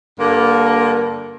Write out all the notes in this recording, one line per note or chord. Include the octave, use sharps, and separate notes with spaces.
G2 D3 A#3